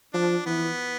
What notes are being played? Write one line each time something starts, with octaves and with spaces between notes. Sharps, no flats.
F3 D4
E3 B3